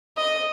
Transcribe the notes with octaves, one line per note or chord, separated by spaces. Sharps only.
D#5